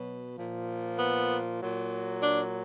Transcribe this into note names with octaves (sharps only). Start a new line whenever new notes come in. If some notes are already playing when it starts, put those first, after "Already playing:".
Already playing: B2 F#3
A#2 F3
B3
A#2 F#3
D4